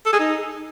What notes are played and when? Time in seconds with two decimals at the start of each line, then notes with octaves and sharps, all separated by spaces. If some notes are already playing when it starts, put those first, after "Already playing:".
0.06 A4
0.13 G#4
0.20 D#4